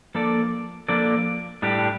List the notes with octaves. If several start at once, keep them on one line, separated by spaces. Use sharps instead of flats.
F3 A#3 D4 A4 D5
F3 A#3 D4 A4 D5
A2 G3 D4 G4